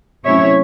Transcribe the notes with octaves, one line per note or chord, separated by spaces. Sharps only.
C3 F#3 A3 C#4 E4 C#5 E5